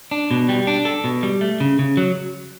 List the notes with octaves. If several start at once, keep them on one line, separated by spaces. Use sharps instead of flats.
D4
B2
G3
D4
A4
B2
G3
A3
C#3
C#3
F#3